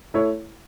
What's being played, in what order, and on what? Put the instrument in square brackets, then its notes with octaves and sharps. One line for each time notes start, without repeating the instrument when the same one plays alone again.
[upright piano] A3 E4 C#5